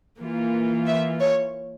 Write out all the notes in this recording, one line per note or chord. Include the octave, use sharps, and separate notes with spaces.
E3 A#3 F4
E5
C#5